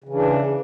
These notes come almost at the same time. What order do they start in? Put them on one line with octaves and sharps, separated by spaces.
C#3 E3 D4